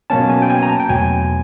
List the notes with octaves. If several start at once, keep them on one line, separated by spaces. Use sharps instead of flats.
B2 F#3 A#3 C#4 A5
G#5
G5
G#5
A#5
A5
G5
E2 B2 F#3 A3 G#5